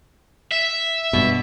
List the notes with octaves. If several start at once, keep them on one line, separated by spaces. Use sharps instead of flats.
E5
G2 B2